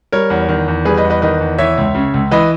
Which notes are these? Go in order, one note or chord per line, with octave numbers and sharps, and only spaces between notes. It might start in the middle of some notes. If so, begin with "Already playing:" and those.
G3 A#4 C#5
E2
D#3
E2
G3 G#4 B4
B4 D#5
E2
B4 D#5
D#3 B4 D#5
E2
E3 C#5 E5
C#2
C#3
C#2
E3 B4 D#5